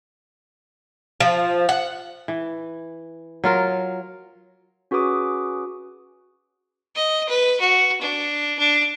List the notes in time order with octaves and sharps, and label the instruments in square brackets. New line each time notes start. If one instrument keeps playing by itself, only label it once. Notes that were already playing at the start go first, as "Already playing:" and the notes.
[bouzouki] F3
F#5
[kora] E3
F#3 F4 A#4
[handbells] C#4 F#4 G#4 B4 D6 D#6
[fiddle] D#5
B4
F#4
D4
D4